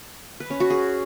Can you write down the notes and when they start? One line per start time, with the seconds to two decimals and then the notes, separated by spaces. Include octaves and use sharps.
0.40 B4
0.50 C#4
0.60 F#4
0.70 G#4